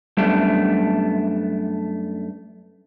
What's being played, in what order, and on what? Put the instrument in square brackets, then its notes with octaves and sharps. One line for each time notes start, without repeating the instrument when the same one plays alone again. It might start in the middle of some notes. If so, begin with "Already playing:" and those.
[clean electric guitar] F#2 G3 A3 B3 D4